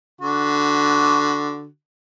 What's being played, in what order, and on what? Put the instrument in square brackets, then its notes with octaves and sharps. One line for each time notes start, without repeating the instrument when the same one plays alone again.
[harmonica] D3 F#4